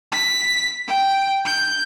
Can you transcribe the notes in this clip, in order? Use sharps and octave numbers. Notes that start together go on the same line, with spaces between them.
B6
G5
G6